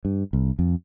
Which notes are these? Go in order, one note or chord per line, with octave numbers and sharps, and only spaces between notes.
G2
C2
F2